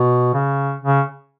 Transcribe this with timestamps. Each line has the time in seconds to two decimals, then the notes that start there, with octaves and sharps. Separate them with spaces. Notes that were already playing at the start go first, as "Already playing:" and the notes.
Already playing: B2
0.34 C#3
0.81 C#3